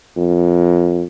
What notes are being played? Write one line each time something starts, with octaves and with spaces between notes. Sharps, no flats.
F2